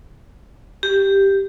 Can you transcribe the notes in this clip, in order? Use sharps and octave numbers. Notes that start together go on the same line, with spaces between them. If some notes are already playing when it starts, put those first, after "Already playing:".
G4